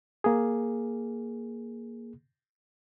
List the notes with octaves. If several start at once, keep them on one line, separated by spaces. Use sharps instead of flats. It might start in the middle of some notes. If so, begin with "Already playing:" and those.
A#3 G#4